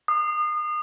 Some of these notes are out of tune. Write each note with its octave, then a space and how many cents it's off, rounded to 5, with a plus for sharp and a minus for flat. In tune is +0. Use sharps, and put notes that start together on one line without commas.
D#6 -35